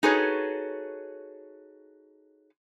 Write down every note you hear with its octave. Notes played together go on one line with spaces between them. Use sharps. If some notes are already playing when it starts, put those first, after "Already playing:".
D#4 F#4 G#4 A4 B4 C#5